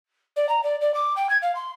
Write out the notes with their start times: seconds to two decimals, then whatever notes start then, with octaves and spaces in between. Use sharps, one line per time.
0.36 D5
0.49 A#5
0.63 D5
0.81 D5
0.94 D6
1.16 G5
1.29 G#6
1.42 F5
1.55 C6